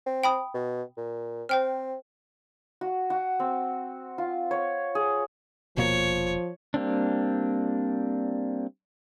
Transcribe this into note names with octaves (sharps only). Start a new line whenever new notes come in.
C4
G5 B5 D#6
B2
A#2
C4 C5 G5 F6
F#4
F#4
C4
F4
C#5
G#4
D#1 B2 F3 A#3 C#5
G3 A#3 C4 D4